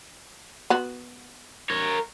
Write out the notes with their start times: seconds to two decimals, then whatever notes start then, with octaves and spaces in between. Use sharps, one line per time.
0.70 B3 F#4
1.70 A#4 C#5